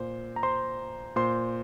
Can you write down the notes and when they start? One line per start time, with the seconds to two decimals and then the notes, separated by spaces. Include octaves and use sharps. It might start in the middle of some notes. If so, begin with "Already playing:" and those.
Already playing: A#2 C5
0.36 A#5
0.43 C5 C6
1.16 A#2 C5 C6